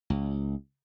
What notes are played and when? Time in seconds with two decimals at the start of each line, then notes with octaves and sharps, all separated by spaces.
0.10 C#2